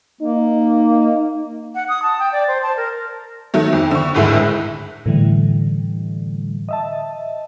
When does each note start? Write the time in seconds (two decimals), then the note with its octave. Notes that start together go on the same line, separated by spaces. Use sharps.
0.21 A#3 D#4
1.75 F#5
1.89 D#6
2.03 A5
2.19 G5
2.32 D5
2.48 C5
2.63 A5
2.77 A#4
3.54 D#3 F#3 A3
3.73 F2
3.91 D3 C#6
4.14 G#1 D2 A2 G#3 E5
5.06 A2 D3 E3 G3
6.69 D#5 E5 A5